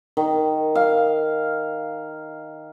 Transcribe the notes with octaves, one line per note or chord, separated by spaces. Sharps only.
D#3
F5